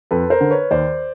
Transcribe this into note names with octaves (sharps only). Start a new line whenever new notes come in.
F2 A4 B4
A#4 C5
D3
B4 C#5
D#2 C5 D5